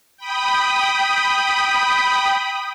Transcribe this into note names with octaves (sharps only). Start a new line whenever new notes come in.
G5 B5 D#6